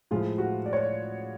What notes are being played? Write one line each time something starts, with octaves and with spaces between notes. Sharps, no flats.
A2 F3 G#3 F4
F#4
D5
C#5